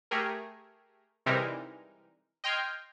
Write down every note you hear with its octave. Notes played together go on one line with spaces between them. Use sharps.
A3 G4 G#4 A#4
C3 E3 G3 G#3 D#4 A#4
D#5 G5 C6 F6 G6 G#6